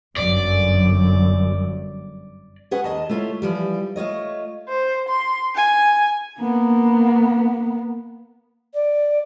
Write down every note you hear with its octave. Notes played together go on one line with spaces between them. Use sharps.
G1 F#2 D5
C#4 G#4 B4 F#5
D#2 D#5 A5
A3 E4 F4 C#5
E3 F3 G3
A3 F4 C#5 D#5
C5
C6
G#5
A#3 B3
D5